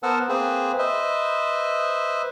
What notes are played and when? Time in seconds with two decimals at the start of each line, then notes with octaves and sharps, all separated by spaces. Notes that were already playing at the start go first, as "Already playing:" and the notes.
0.03 B3 A#4 C5 F#5 A5 E6
0.29 A#3 C4 G#4 B4 C5
0.79 B4 C5 D#5 E5